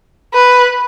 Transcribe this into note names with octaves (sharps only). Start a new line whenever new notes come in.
B4